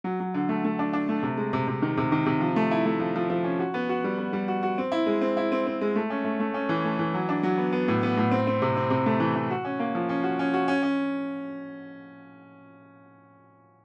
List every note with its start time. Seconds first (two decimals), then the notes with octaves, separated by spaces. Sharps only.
0.04 F#3
0.20 F#3
0.34 D3
0.49 A3
0.64 A3
0.79 D4
0.93 D4
1.09 A3
1.23 C3
1.37 G#3
1.53 C3
1.68 C3
1.82 D#3
1.97 C3
2.12 D#3
2.26 C3
2.41 F3
2.56 A3
2.71 E4
2.86 A3
3.00 F3
3.16 F3
3.30 F3
3.44 C#4
3.59 F#4
3.74 B3
3.89 F#4
4.04 G3
4.18 B3
4.33 G3
4.48 F#4
4.63 F#4
4.78 C4
4.92 E4
5.06 G#3
5.21 C4
5.37 E4
5.52 C4
5.67 C4
5.81 G#3
5.95 A3
6.10 C#4
6.25 A3
6.40 A3
6.54 C#4
6.69 E3
6.84 A3
6.99 E3
7.14 F#3
7.29 D4
7.43 F#3
7.58 B3
7.72 B3
7.88 A2
8.03 B3
8.17 A2
8.31 C4
8.47 C4
8.62 C3
8.77 C4
8.90 C3
9.06 A3
9.20 E3
9.35 E3
9.50 F#4
9.65 C#4
9.79 A#3
9.95 F3
10.09 C#4
10.23 F#4
10.39 C#4
10.54 F#4
10.68 C#4
10.83 C#4